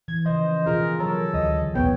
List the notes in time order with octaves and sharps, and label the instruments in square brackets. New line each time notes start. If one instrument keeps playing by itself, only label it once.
[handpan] E3 [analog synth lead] G#6
[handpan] C#3 F3 [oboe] C5 [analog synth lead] D#5
[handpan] B2 F4 G#4 [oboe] A#4
[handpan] F#3 C#5 [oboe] A4 [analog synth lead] A#4
[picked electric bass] D2 [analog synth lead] D#5
[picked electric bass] D#1 B1 [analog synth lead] B3 [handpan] B4 C#5 [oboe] G5